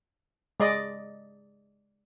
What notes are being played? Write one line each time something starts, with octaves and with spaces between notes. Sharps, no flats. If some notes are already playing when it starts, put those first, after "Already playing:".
G#3 D5 D#5